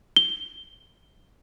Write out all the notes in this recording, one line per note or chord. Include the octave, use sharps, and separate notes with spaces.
G7